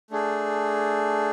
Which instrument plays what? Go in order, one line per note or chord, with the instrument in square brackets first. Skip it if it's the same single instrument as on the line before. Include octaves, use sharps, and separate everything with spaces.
[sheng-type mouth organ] A3 D4 G#4